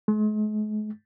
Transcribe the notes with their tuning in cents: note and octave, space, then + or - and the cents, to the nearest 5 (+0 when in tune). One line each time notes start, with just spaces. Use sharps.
G#3 +45